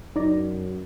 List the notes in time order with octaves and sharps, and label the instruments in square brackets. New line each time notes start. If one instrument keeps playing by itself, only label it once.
[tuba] F#2 [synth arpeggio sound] D#4 D5 A#6